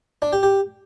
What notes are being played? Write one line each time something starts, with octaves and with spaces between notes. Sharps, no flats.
D4
G4
G4